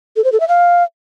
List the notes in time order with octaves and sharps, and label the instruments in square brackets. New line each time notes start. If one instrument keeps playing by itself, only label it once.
[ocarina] A4
C5
A4
E5
F5